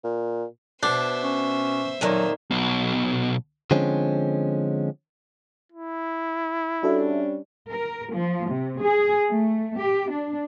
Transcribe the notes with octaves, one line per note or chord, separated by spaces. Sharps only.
A#2
B2 D4 C5 E5
C#4
F2 A#2 D#3 F#3
B1 B2
D3 F3 G#3 C4 C#4
E4
G3 C#4 D4 F#4 A4 E5
A#4
F3
C3
G#4
A3
G4
D4